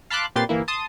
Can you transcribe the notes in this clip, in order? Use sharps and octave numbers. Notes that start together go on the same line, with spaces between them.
F5 A5 B5 C6 D6 F#6
A#2 C4 G4 B4 C6 A6
G1 E3 A#3 E4
A5 C6 D#6